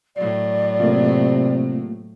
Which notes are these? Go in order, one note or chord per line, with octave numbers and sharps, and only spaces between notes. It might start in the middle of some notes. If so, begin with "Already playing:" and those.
A2 F#3 D5
C3 A3 A#3 F4